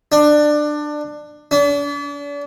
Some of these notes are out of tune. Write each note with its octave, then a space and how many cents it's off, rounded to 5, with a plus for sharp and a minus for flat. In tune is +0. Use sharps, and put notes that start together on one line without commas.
D4 +20
D4 -40